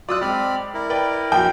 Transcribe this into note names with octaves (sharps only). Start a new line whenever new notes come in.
F#3 F4 D5 D#6 E6 F#6
G#3 C4 B5 F6
E4 A#4
B4 D5 G5
A#1 F#3 G5